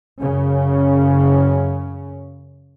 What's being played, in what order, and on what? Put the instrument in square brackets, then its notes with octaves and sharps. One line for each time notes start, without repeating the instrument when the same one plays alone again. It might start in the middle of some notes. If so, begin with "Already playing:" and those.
[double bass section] F#2 C#3 C#4